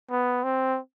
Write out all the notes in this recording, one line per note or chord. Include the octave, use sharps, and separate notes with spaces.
B3
C4